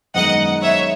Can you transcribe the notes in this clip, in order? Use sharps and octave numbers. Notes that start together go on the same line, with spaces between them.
F#2 D#3 G#3 B3 D#4 D#5 F#5
C#5 E5